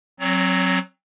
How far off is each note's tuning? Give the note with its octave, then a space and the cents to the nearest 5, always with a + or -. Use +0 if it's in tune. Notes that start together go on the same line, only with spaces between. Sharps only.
F#3 +0 C4 +25 C#5 +35